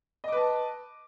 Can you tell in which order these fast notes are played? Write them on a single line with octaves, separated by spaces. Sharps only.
D#5 D6 B4 A5